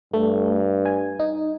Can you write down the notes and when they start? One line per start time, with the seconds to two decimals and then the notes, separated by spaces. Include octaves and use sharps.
0.14 G2 A3
0.85 G#5
1.19 D#4